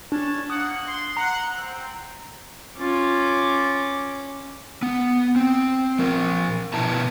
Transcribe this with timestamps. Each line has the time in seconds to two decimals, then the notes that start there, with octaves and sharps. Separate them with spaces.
0.12 C#4 D4 C#5 A5
0.50 A#3 F#5 D#6
0.86 C6
1.17 F#5 A#5
1.56 C4
2.77 C#4 F4 D6
4.83 B3
5.36 C4
5.99 F3 A#4
6.74 B2 B3 E4 E5 A5 A#5